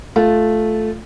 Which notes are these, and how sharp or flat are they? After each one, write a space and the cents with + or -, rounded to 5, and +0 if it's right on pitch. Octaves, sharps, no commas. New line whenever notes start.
A3 -10 F4 +0